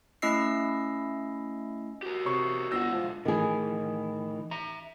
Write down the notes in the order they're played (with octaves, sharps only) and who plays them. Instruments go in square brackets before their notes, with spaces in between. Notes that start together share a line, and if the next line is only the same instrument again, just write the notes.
[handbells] A3 C#4 E4 D#5 E6 C7
[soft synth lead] F#4 [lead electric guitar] G4 A#4
[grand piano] C3 C#5 C#6
[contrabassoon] G1 [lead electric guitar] G4 F#5 [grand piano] E6 A#6
[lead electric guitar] B1 G#2 [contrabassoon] F3 [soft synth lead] G#3
[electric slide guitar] A2 E3 [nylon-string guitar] D#3 G#4
[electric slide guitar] E5 A#5